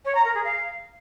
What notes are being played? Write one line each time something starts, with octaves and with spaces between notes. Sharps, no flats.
C#5
A#5
A#4
G#4
F5